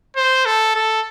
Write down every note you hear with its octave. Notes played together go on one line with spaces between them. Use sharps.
C5
A4
A4